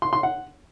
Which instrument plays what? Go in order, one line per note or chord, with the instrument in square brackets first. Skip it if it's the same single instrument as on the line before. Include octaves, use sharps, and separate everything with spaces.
[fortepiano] C6
C6
F#5